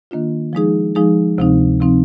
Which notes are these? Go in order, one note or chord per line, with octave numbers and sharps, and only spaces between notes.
D#3 A#3 D4 F4
F3 G#3 D#4 G#4
F3 G#3 D#4 G#4
D2 C3 F3 C4 D#4
C3 F3 C4 D#4